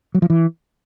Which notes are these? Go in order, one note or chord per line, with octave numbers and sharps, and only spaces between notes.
F#3
F3
E3